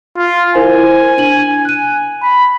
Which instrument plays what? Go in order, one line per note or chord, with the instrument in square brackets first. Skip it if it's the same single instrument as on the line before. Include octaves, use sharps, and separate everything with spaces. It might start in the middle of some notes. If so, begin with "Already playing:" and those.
[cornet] F4
[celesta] E4 A#4 C5 [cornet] G#5
[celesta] D4 D#7 F#7
F#6 D#7
[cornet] B5